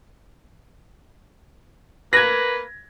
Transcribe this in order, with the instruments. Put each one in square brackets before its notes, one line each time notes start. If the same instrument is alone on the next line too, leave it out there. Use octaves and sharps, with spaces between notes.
[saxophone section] A#3 B4 [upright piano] G#6 A#6